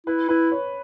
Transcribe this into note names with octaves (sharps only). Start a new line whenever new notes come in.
E4 B4
E4 B4
C#5